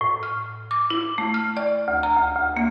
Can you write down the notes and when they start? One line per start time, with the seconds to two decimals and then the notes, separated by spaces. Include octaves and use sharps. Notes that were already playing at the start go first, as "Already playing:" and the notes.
0.01 A2
0.23 F6
0.71 D6
0.90 E4
1.18 A3
1.34 F6
1.57 D5
1.88 D2
2.03 A#5
2.17 D2
2.35 D2
2.57 A#3